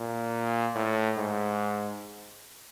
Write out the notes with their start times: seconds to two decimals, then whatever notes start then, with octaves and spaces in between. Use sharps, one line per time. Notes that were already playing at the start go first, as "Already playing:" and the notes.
Already playing: A#2
0.75 A2
1.17 G#2